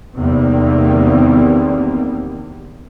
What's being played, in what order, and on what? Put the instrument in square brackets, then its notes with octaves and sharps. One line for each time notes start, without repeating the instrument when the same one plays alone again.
[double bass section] E2 C3 D#3 G3 A#3 C4